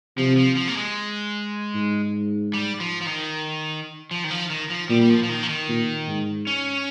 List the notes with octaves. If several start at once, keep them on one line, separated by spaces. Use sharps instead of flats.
C3 F3
F3
F3
A#3
G#3
G#2
G3
F3
F3
D#3
F3
D#3
F3
D#3
F3
A#2 G3
G3
F3
F3
D#3
F3
D#3
A#2
G#2
C#4